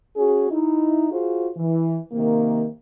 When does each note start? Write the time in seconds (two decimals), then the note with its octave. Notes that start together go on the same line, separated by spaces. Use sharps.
0.16 C#4 F#4 G#4
0.50 D#4 E4
1.10 F4 F#4 G#4 C5
1.55 E3
2.12 C3 D#3 A#3